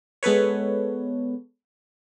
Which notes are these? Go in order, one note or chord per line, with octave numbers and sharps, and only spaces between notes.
G#3 B3 A4 B4 C#5